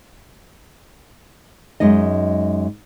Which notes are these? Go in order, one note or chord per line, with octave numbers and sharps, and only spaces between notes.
F#2 G#3 D#4 D#5